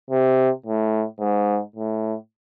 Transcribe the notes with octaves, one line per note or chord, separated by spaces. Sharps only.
C3
A2
G#2
A2